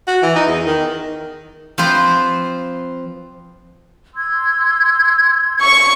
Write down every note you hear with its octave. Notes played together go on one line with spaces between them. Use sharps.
F#4
E3
D#4
E2
D#3
F3 C4 B4 C5
C6 E6 G#6
C#6